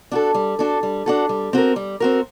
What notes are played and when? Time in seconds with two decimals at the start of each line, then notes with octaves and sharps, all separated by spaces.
0.12 D4 F#4 A4
0.34 G3
0.59 D4 F#4 A4
0.83 G3
1.06 D4 F#4 A4
1.29 G3
1.53 C4 F#4 A#4
1.76 G3
2.00 C4 F#4 A#4